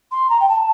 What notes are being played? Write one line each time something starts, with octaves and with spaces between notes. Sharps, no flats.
C6
A#5
G5
A5